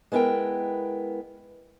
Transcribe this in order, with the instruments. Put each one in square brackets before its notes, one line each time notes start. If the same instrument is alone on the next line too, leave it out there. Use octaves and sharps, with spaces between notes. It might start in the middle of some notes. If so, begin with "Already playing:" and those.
[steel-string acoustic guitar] G#3 B3 E4 A#4 G5